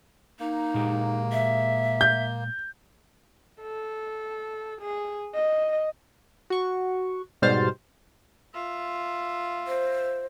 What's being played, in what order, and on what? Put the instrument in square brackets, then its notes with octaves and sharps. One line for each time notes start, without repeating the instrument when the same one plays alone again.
[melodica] A#3 [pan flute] D#4
[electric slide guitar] A#2 G#3 G4
[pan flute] E5
[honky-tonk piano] G6
[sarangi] A4
G#4
D#5
[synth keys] F#4 C#6
G#2 B2 G3 C5 F6 A6
[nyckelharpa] F4 E5
[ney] C5